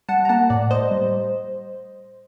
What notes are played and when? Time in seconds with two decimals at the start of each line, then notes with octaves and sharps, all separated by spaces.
0.09 G3 F#5 A5
0.25 A#5
0.29 A#3 F#5 A5
0.50 A2 D5
0.71 A2 C5 D#5
0.91 G3